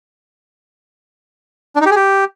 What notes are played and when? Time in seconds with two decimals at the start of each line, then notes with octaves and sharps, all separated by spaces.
1.76 D4
1.81 D#4
1.86 G4
1.91 G#4
1.96 G4